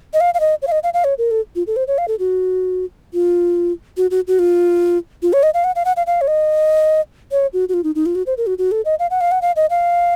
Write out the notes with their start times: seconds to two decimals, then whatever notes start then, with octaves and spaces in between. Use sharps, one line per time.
0.14 D#5
0.21 F5
0.34 F5
0.40 D#5
0.62 C#5
0.67 F5
0.72 D#5
0.83 F5
0.94 F5
1.04 C#5
1.18 A#4
1.31 A4
1.56 F4
1.67 A4
1.76 C5
1.88 C#5
1.98 F5
2.08 A4
2.19 F#4
3.14 F4
3.97 F#4
4.11 F#4
4.28 F#4
4.39 F4
5.23 F4
5.33 C#5
5.43 D#5
5.54 F5
5.64 F#5
5.76 F5
5.85 F#5
5.97 F5
6.07 F5
6.21 C#5
6.28 D#5
7.32 C#5
7.53 F#4
7.69 F#4
7.74 F4
7.84 D#4
7.95 D#4
8.06 F4
8.15 F#4
8.27 C5
8.37 A#4
8.47 F#4
8.58 F#4
8.72 A4
8.85 D#5
8.99 F5
9.10 F#5
9.21 F5
9.32 F#5
9.42 F5
9.56 D#5
9.70 F5